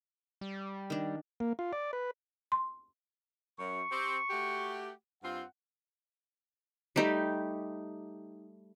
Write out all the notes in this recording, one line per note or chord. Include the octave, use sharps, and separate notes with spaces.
G3
D#3 D4
A#3
F4
D5
B4
C6
F#2 C#6
C4 G4
A3 F#4 G4
G2 C4 F4 F#5
G3 A3 D#4 G4